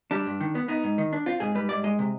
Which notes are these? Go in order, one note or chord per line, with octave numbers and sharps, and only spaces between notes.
G3 D4
G2
D#3
B3
B3 D#4
G#2
D#3
D4
C4 F4
G#2 G#4
G3 B4
G#2 D5
G#3 D#5
C3